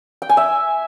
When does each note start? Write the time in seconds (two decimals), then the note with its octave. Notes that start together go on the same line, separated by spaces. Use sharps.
0.22 G5
0.29 G#5
0.37 E5